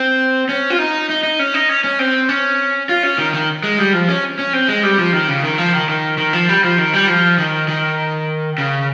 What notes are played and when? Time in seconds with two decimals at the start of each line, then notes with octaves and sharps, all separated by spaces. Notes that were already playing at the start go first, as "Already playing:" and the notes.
Already playing: C4
0.49 C#4
0.70 F4
0.79 D#4
1.10 D#4
1.23 D#4
1.39 C#4
1.54 D#4
1.69 C#4
1.84 C#4
1.99 C4
2.29 C#4
2.89 F4
3.03 C#4
3.18 D#3
3.34 D#3
3.63 G#3
3.79 G3
3.93 F3
4.09 C#4
4.39 C#4
4.53 C4
4.68 G#3
4.83 G3
4.98 F3
5.13 D#3
5.28 C#3
5.44 D#3
5.58 F3
5.73 D#3
5.89 D#3
6.18 D#3
6.33 F3
6.49 G3
6.64 F3
6.78 D#3
6.93 G3
7.08 F3
7.38 D#3
7.68 D#3
8.58 C#3